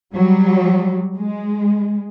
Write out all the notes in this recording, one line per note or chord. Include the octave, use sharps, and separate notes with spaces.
F#3 G3
G#3